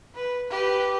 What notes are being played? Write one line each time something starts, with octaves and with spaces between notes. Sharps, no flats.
B4
G4 B4